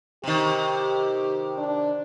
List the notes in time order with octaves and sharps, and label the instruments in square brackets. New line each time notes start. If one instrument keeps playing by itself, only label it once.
[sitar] C3 D#3 [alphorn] G4
[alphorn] D4